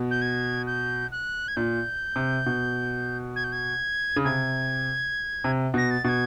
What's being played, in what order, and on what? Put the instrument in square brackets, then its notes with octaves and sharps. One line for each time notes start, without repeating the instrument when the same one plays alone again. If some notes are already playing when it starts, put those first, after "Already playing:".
Already playing: [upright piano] B2
[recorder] G6
G#6
G6
F#6
G#6
[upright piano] A#2 [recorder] G6
[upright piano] C3
B2
[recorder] G#6
G6
G#6
[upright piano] C#3
[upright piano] C3 [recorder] G#6
[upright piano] C3
[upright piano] B2 [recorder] A#6
[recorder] A6
[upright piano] B2 [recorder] G#6 A6